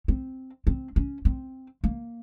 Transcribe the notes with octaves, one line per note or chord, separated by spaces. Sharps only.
C4
C4
C#4
C4
A#3